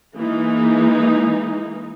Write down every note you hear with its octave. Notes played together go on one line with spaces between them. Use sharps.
E3 G#3 A#3 D#4